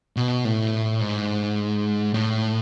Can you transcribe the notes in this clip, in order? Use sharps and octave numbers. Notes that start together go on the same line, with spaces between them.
B2
A2
G#2
A2